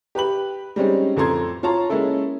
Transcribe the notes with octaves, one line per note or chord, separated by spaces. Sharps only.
G4 B4 B5 F#7
G3 G#3 C4 C#4 D#4
A1 F2 A4 A#5 C6 G#6
F4 C#5 A5 A#5 C6
G#3 A#3 C#4 E4 A4